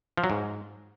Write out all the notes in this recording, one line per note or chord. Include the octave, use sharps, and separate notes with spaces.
F3
F#3
G#2